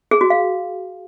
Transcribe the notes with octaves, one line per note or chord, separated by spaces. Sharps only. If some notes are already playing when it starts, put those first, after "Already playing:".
G#4
F#4
F5